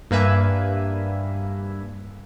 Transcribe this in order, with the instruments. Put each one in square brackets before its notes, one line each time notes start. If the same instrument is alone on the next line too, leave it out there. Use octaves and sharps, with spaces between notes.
[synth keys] G2 A#3 B4 E5 G#5